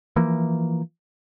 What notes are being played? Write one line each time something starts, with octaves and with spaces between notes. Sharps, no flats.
E3 F3 A#3